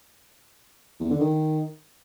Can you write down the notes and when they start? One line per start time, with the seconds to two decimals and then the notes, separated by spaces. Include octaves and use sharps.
1.00 E2
1.10 D3
1.21 D#3